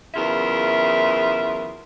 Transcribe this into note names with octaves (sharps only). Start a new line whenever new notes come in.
E2 C#3 F#3 F4 A#4 E5